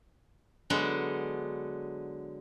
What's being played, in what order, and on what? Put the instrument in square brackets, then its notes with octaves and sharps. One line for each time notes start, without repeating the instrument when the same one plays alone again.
[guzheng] D3 F#3 G#3 B3